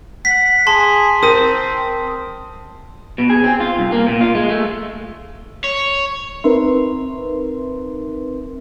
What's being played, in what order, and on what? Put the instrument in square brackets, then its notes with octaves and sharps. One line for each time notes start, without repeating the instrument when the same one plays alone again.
[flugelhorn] F#5 [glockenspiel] B6
[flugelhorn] G#4 [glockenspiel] A5 C6
[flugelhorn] C4 [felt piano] A#4 D#7 [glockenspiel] D#6
[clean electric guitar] B2
G#4
C4
F4
C2
A#3
A#2
F4
G#3
A3
[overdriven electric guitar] C#5
[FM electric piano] C4 D#4 A#4 B4 E5 C6